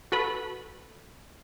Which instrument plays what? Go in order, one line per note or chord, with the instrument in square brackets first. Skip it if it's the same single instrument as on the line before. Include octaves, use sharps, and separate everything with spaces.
[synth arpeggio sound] F#4 A4 B4 B5